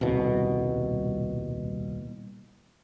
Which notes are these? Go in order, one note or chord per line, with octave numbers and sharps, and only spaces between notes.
D#1 C2 B2